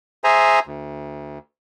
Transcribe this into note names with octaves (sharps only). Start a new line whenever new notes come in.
G#4 C5 E5 G#5 A#5
D2